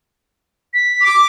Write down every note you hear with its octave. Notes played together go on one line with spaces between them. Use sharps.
B6
D6